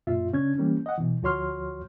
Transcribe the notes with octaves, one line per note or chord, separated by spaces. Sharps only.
F#2 A#2 F4 E5
C#3 C#4 D4 G#6
E3 G3 A#3 C#4
D#5 F#5
B2 E3
D2 F3 F#4 C#5 C6 F6